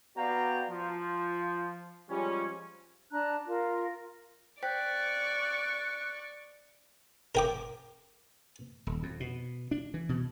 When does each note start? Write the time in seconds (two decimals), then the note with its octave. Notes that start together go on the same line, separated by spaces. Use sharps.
0.17 B3 F#4 D5 F5 G5 A#5
0.69 F3
2.10 F3 G3 G#3 C#4
3.11 D4 A5 A#5 F#6
3.47 F4 A#4
4.63 C5 D5 G5 C#6 F#6 B6
7.35 A#4 G5 D6
8.87 D#1
9.03 F2
9.20 B2
9.71 D4
9.94 E3
10.09 B2